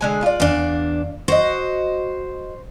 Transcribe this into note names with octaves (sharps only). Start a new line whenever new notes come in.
D3 G#3 G#5
F4 D5
E2 D4 D5 F5
F#4 C5 D#5